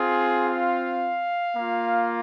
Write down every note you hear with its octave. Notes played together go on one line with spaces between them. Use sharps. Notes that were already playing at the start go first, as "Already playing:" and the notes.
Already playing: C4 F4 G#4
F5
A#3 F4